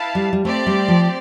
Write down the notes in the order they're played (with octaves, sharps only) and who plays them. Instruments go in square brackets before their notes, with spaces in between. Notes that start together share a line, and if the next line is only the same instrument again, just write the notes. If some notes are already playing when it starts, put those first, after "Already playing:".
Already playing: [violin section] E4 B4 F5 A5
[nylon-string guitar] G3
G3
[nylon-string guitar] A3 [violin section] C4 G4 D5
[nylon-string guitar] G3
F3